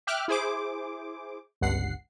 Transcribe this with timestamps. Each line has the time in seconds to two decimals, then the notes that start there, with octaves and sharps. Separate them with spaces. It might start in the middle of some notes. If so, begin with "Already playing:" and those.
0.07 E5 G5 D6 F6 F#6
0.28 E4 G#4 C5 D6
1.61 G1 C#2 G2 F#5 C7